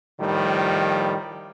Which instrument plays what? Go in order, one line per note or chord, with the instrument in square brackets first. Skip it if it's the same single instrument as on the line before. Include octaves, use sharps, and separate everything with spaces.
[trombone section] A2 D#3 F3 G3